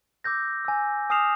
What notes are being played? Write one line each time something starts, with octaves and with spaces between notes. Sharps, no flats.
D6 E6 G6 A#6
G#5 E6
G#5 D#6 F6 C7 E7 F7